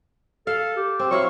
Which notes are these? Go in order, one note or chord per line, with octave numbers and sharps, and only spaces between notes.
A4 F5
G4
C4
F#3 E4 F5 C#6